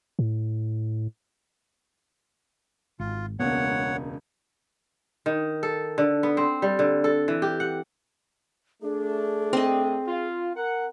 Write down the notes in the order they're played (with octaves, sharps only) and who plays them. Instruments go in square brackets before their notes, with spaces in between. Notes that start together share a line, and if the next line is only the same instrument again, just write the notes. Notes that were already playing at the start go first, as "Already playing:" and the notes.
[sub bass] A2
[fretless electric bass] G#1 [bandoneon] F4
[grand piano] E1 C#2 A#3 [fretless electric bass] B3 [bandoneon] C#5 F#5
[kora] D#3
A4
D3
B3
C4
G3
D3
A4
E3
G4
F#5
[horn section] A3 D4 [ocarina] G#4
[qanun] C4 D#5
[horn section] F4
A#4 F#5